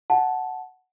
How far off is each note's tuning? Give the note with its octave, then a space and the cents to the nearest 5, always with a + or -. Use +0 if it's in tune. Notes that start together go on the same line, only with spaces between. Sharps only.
F#5 +0 A5 -10